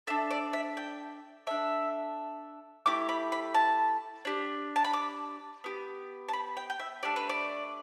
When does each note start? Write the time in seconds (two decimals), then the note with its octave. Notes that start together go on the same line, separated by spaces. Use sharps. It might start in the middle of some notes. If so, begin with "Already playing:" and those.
0.07 D4 A4 E5
0.31 D5
0.53 E5
0.77 G5
1.47 D4 A4 E5
2.86 A3 E4 G4 D6
3.09 B5
3.32 B5
3.54 A5
4.25 D4 G4
4.76 A5
4.84 B5
4.93 D6
5.64 B3 G4
6.28 A5
6.33 B5
6.57 G5
6.70 G5
6.80 E5
7.03 A3 D4 G4 D5
7.16 B4
7.29 D5